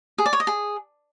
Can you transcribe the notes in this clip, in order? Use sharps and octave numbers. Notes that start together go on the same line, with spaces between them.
G#4
D5
C#5
D#5
G#4